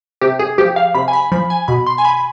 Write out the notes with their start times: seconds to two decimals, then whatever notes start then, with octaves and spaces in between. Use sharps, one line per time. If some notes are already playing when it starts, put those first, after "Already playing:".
0.21 C3 G4
0.39 G#4
0.58 F3 G4
0.76 F5
0.95 C3 B5
1.08 G#5
1.13 B5
1.32 F3 B5
1.50 G#5
1.68 B2 B5
1.87 C6
1.98 G#5
2.05 B5